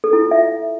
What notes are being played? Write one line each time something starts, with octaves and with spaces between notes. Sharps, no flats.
A4
E4
F4
E5